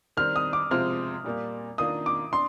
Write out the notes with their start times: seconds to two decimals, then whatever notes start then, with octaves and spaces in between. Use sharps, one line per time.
0.17 D#3 G3 C4 F6
0.36 D#6
0.53 D6
0.71 C3 F3 G#3 C4 F4 F6
1.24 A#2 G3 A#3
1.78 D#3 A#3 D4 F4 D#6
2.06 D6
2.33 D4 C6